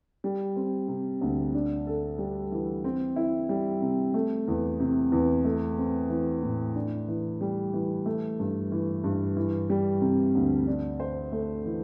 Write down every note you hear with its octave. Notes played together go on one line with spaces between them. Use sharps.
G3
C4
C3
D2
D4
A4
G3
E3
C4
E4
G3
C3
A3
E2
C3
E2
A3
C4
E3
A2
D4
E3
G3
E3
A3
G2
E3
G2
E3
G3
C3
D2
D4
C5
A3
E3